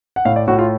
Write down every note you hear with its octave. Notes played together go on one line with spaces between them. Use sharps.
F#5
A2 F5
D5
A2 F#4
F4